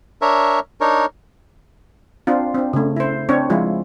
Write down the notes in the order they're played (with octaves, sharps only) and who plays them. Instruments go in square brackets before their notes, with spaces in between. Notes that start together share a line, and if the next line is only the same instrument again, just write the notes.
[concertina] D4 A#4 C#5 E5
D4 D#4 A#4 C#5
[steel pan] C4 D4 F4
C4 D4
C#3 A3
E4 C5
C4 D4 C#5
F3 G#3 E4 F4